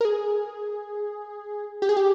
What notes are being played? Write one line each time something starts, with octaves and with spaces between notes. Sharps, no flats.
A#4
G#4
G4
G#4
G4